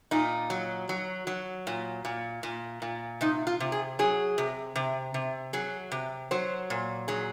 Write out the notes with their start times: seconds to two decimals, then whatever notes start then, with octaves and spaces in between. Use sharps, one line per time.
0.11 A#2 D#4
0.50 F#3
0.89 F#3
1.27 F#3
1.67 A#2
2.05 A#2
2.43 A#2
2.82 A#2
3.21 C3 D#4
3.47 F4
3.60 C3
3.72 G#4
3.99 F#3 G#4
4.38 C3
4.76 C3
5.14 C3
5.53 F#3 G#4
5.92 C3
6.31 F#3 C5
6.70 A#2
7.08 F#3 G#4